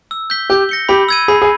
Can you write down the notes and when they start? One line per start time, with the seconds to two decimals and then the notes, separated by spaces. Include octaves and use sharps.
0.11 E6
0.30 G6 B6 G7
0.50 G4 G6
0.69 A#6 C#7 G7
0.89 G4 B5
1.09 E6 G#6 D#7
1.28 G#4 B5
1.42 G#4